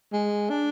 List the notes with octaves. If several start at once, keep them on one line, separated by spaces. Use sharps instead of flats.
G#3
D4